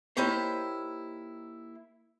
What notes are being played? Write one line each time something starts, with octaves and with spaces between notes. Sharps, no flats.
A#3 D#4 E4 G4 C5 C#5